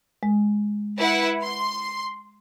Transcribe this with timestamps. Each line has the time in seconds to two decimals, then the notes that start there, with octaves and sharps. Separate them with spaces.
0.23 G#3
0.99 E4 B4 F#5
1.42 C6